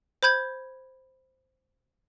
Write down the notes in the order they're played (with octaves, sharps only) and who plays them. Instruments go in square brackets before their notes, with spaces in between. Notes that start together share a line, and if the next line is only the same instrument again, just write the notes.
[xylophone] C5 B5 G6 G#6